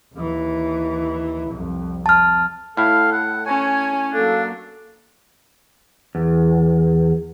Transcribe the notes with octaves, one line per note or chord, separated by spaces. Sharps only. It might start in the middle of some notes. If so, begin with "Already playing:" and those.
D#2 E3
C2 F2
F2 A5 F6
A2 E4 A4 F5
F#5
C#4 C#5 G#5
F#3 A#3 D4 A4 F5
E2